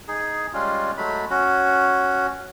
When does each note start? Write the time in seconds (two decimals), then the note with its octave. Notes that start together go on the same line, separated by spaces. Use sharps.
0.08 D#4 G#4
0.53 G3 G#3 C#4 F4
0.97 F#3 G#3 A3 B5
1.30 C#4 F#4